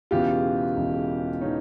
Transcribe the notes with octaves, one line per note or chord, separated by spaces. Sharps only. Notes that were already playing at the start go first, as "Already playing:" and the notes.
E1 E2 C#3 E3 F4 G4
E1 E2 C#3 E3
C#3 E3 C#4 D#4